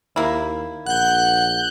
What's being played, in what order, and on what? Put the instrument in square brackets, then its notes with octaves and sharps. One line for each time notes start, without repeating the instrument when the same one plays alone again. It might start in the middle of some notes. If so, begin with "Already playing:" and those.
[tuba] D#2 [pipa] A#3 E4
[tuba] A#1 [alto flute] F#5 [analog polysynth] F#6 G6